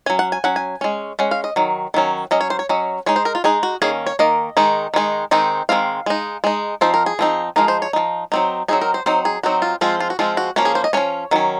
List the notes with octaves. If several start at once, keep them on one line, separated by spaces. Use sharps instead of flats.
F#3 C#4 G#5
F#5
G#5
F#3 C#4 F#5
G#5
G#3 C#4
G#3 C#4 F#5
F5
D#5
D#3 F#3
D#3 F#3 C#4
F#3 C#4 D#5
C#5
C5
C#5
F#3 C#4 D#5
G#3 D#4 C#5
C5
A#4
F4
G#3 D#4 G#4
F#4
D#3 A#3 C#4 G#4
C#5
D#3 A#3 D#5
D#3 G#3 D#4
D#3 G#3 D#4
D#3 G#3 C4 D#4
D#3 G#3 C4 F5
G#3 D#4
G#3 D#4
F3 C4 D#4 C5
A#4
G#4
F3 C4 D#4
F3 G#3 D#4 A#4
C5
C#5
F3 G#3 D#4
F#3 C4 D#4
F#3 C4 D#4 G#4
A#4
C5
F#3 C4 D#4 C5
G#4
F#3 C4 D#4 F#4
F4
F3 G#3 C4 F4
F4
F#4
F3 G#3 C4 F4
F#4
F3 A#3 C#4 F#4
G#4
C5
D#5
F3 A#3 C#4 C#5
D#3 F#3 C#4